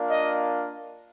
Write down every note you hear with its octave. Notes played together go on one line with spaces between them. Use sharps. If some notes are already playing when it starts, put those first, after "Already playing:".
Already playing: A#3 D4 F4
D#5